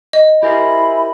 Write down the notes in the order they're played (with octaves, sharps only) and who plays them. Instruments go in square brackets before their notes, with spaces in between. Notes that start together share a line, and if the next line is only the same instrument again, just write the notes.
[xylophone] D#5
[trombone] E4 [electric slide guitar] G4 A#4 C5 [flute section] G#5 B5